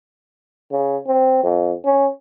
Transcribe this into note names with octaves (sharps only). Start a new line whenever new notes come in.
C#3
C4
F2
C#4